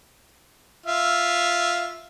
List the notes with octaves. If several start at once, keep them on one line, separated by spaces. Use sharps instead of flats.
F4 E5